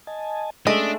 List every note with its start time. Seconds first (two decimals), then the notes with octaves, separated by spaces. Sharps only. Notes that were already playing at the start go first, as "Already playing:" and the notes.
0.07 D#5 G#5 A5
0.67 G#3 A3 C#4 D4 D#5 E5